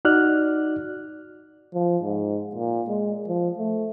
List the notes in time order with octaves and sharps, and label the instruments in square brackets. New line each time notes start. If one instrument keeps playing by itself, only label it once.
[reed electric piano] D#4 F#4 D5 F6 F#6
[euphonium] F3
G#2
A#2
G#3
F3
A3